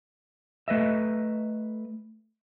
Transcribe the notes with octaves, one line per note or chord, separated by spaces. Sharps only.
A3 B4 D#5 E5